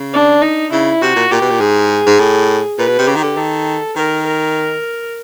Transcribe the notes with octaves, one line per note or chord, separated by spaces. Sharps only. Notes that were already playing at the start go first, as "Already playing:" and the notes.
Already playing: C#3
D4
D#4
C#3 E4
C3 F#4
A#2
A#2 G4
B2
A#2
G#2 G#4
G#2
A2
A#2 B4
B2
C3
C#3 G4
D#3
D3
D#3 A4
D#3 A#4
A#4